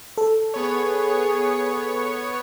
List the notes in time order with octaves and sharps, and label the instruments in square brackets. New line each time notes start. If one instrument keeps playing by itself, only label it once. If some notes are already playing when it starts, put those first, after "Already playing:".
[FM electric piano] A4
[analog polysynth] B3 C#5 [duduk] G#4